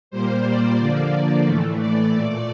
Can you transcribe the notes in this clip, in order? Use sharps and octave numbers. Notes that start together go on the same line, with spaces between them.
A#2 G3 A#3 C5
D5
D3 F3 A#3 D5
A2 E3 A3
D5
A#2 A3 D5